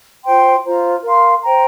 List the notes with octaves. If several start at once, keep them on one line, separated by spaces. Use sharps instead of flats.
F4 C5 G5 C6
F4 C5 A#5
A#4 F5 C6
C5 G5 A#5